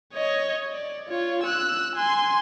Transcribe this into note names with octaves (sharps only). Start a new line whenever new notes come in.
C#5 D#5
D5
F4 C#5
E6 F#6
G#5 C6